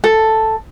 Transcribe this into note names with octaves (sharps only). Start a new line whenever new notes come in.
A4